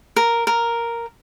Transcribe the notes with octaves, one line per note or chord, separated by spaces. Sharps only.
A#4
A#4